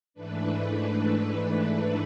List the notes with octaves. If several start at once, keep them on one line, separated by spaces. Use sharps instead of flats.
G#2 E3 A3 D4 B4
B4